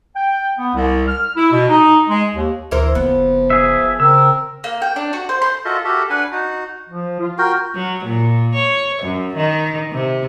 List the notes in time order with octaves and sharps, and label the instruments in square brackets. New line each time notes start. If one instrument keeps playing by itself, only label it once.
[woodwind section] G5
B3
C2
F6
E4
B2
D#4
G#3
D#2
[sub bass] D2 [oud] E3 A#4 C5
[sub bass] F#1 [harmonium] F3 [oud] B3
[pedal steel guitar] G#4 E5
[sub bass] C#3 [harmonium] C4 A#4 [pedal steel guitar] E6
[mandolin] A#3
G5
D4
F#4
C5
C6
[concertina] F4 F#4 A4 A#4 D#5 E5
F#4 G4 A4 A#4 E5
D4 B4 F#5 G#5
D#4 F#4
[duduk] F3
F4
[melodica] F#4 A#4 G5
[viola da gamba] F#3
A#2
C#5
F#2
D#3
C3